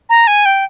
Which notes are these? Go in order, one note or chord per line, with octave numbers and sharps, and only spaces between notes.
A#5
G#5
G5